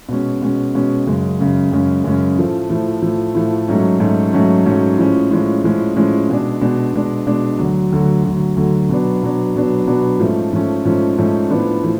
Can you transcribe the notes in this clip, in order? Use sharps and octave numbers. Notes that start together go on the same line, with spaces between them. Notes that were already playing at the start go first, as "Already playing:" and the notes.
B2 G#3 C#4
B2 G#3 C#4
B2 G#3 C#4
F#2 C#3 G#3 C#4
F#2 C#3 G#3 C#4
F#2 C#3 G#3 C#4
F#2 C#3 G#3 C#4
A2 F3 A3
A2 F3 A3
A2 F3 A3
A2 F3 A3
G#2 F#3 A3 C#4
G#2 F#3 A3 C#4
G#2 F#3 A3 C#4
G#2 F#3 A3 C#4
A2 F3 G#3 C#4
A2 F3 G#3 C#4
A2 F3 G#3 C#4
A2 F3 G#3 C#4
B2 G#3 D4
B2 G#3 D4
B2 G#3 D4
B2 G#3 D4
D2 D3 F#3
D2 D3 F#3
D2 D3 F#3
D2 D3 F#3
B2 F#3 B3 D4
B2 F#3 B3 D4
B2 F#3 B3 D4
B2 F#3 B3 D4
G#2 F3 A3 C#4
G#2 F3 A3 C#4
G#2 F3 A3 C#4
G#2 F3 A3 C#4
A2 F3 B3 D4
A2 F3